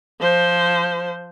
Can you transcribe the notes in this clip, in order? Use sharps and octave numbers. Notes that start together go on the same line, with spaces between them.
F3 C5